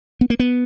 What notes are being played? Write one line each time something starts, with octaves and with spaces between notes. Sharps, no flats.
B3
A#3
B3